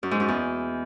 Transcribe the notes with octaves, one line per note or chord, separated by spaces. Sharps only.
F#2
G#2
F#2
E2